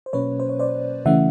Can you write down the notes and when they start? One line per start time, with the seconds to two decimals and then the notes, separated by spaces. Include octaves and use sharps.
0.06 C5
0.13 B2 F#3 A#3 C#4 B4 C#5
0.40 C5
0.49 C#5
0.59 C5 D5
1.05 C#3 E3 A3 C#4 E5 F#5